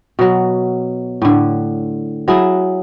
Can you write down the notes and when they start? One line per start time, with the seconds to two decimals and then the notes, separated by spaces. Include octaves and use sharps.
0.19 B2 F#3
1.22 A2 D3
2.28 F#3 E4 G#4